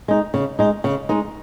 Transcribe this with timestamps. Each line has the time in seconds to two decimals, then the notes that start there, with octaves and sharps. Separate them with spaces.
0.08 G#3 D#4
0.34 C#3
0.59 G#3 D#4
0.84 C#3
1.09 G#3 D#4